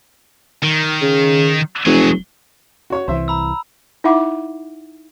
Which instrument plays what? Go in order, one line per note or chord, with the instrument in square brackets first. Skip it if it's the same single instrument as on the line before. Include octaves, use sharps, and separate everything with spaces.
[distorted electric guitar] D#3
[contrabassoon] C#3
[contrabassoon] F1 [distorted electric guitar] F#3 G#4
[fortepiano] F#4 C#5 C#6
[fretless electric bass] C2 E3 [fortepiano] C5 E5
[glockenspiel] A#5 B5 E6
[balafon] D#4 E4 E5 F#5 D6